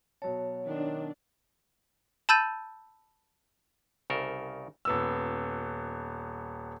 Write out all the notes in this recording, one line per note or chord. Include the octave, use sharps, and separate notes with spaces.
B2 F#3 C#5 A5
D#3 D4
A5 B5 E6 G6 A6 D#7
C2 C#3 A4 A#4 C5
D#1 B3 E6